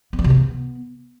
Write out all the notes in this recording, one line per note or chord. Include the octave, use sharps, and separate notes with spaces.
B3
E3
C3
B3